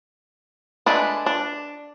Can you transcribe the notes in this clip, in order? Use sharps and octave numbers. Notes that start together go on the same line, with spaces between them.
G#3 A3 D4 B4
D4